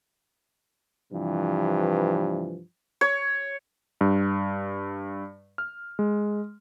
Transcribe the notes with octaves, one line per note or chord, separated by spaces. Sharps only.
G2 C3 E3 F3
C#5
G2
F6
G#3